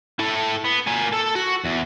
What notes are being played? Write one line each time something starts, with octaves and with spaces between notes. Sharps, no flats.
E4 A4
B3
A#3 G#5
A4
F#4
E2